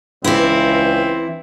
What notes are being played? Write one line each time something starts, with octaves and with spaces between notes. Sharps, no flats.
C#2 E3 C4 E4